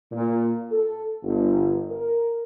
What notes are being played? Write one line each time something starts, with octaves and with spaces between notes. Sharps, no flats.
A#2
A4
G1
A#4